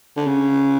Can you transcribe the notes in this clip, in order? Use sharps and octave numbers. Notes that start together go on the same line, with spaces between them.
D3
C#3